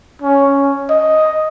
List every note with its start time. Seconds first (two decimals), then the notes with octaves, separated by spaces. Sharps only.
0.22 C#4
0.90 D#5